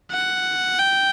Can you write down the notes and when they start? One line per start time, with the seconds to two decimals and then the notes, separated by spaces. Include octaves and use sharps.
0.12 F#5
0.79 G5